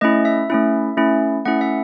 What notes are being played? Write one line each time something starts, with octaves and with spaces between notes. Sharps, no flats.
A3 C#4 E4 D#5
E5
A3 C#4 E4
A3 C#4 E4
A3 C#4 E4 F#5
E5